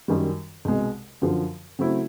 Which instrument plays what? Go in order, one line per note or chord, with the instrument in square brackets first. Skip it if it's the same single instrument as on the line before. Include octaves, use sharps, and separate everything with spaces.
[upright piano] F#2 D#3 G3
C2 B2 G#3
F#2 D3 F3
C#3 F#3 A3 C4 E4